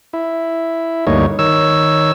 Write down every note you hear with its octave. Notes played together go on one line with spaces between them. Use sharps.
E4
D2 G2 A#3 D#4 C#5
D#3 C#5 E6